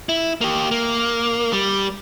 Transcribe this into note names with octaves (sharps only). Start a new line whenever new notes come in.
E4
A#3 G4
A#3
G3